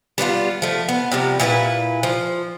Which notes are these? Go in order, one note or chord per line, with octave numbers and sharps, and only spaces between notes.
G3 B3 D4 F4
F3 A3
B3
C3 F3 G3
A#2 E4 F#4 B4
F3